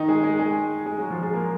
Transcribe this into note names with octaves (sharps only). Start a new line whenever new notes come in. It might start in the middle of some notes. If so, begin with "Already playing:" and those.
Already playing: D#3 D#4
G#3 G#4
G#3 G#4
G#3 G#4
G#3 G#4
F#3 F#4
F3 F4
G#3 G#4
A#3 A#4